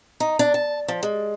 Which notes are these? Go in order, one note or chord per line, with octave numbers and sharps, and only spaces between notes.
D#4
D4
A5
F3
G#3